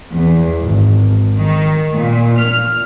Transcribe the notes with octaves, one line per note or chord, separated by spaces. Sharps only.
E2
G#1
D#3
A#2
F6